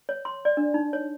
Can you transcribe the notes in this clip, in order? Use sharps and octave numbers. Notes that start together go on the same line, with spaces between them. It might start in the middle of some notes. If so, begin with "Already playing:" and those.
C#5
C6
D5
D4
D#4
C#5